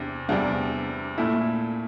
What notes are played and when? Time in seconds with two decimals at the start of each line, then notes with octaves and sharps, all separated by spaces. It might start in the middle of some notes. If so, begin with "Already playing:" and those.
Already playing: E2 C3 D4
0.29 E2 C3 G3 D4
1.18 A#2 A3 E4